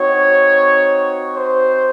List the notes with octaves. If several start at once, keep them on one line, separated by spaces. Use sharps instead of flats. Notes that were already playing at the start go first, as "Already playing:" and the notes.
Already playing: C4 D#4 F#4 C#5
C5